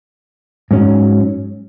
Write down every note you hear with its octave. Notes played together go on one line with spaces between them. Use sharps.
G#2 F#3 C#4